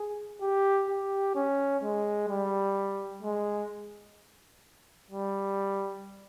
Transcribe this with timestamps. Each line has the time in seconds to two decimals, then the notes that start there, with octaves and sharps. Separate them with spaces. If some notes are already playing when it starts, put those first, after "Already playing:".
Already playing: G#4
0.41 G4
0.88 G4
1.35 C#4
1.83 G#3
2.28 G3
3.23 G#3
5.11 G3